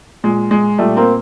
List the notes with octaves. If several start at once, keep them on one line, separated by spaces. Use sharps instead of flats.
A#2 G#3
G#3
A#2 G3 A3
A#3 C4